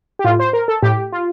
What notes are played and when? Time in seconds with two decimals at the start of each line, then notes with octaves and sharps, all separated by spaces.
0.19 G4
0.24 A2 F4
0.39 C5
0.53 A#4
0.68 A4
0.82 A2 G4
1.12 F4